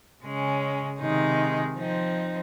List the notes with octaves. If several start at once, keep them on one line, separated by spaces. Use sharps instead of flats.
C#3 G#3 C#4
C3 D#3 G#3 D#4
F3 C4 D#4